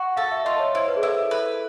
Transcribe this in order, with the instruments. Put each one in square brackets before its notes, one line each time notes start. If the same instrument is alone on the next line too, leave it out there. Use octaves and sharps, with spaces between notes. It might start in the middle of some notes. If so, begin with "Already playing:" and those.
Already playing: [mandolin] F#4
[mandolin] A4 [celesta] F5
[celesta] E5
[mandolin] F4 [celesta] D#5
[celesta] C#5
[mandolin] E4 [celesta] C5
[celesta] B4
G#4
[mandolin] E4 [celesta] A4
[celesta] A4
[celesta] A4 [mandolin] B4